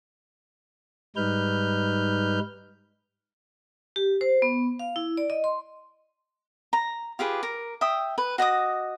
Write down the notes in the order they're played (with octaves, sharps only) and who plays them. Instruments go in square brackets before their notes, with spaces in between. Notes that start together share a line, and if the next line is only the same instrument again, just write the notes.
[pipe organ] G#2 G3 D#4 B4 F6 G6
[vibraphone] G4
C5
B3
F5
E4
D5
D#5
C6
[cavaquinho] A#5
F4 G4 G#4 B4
A#4
E5 G5 D#6
B4
F#4 D#5 D6 D#6